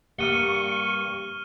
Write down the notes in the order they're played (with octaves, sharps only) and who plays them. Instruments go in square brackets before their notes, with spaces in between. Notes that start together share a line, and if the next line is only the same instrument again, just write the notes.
[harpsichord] G2 A#3 F#5 [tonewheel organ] C#6 [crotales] F6 D#7 G7